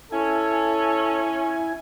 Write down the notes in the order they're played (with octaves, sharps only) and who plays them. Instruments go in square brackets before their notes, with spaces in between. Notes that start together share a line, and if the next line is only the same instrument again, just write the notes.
[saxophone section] C#4 [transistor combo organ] E4 G#5 [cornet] A4